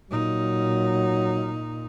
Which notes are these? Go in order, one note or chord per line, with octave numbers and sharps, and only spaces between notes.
A#2 F#3 D#4